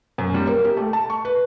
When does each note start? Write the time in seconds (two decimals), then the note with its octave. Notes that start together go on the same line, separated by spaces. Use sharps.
0.18 F#2
0.34 G3
0.47 A#3
0.65 G4
0.77 A3
0.93 A5
1.10 C#6
1.25 B4